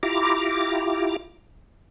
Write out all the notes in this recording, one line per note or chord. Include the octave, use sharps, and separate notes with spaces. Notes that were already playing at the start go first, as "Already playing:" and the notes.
E4 F4 G4 A#5 D6